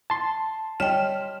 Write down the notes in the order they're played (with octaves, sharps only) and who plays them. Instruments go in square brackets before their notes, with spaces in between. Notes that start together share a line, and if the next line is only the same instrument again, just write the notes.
[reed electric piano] A5 C6
[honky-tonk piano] G3 F6 E7 [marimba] C#5 D#5 G5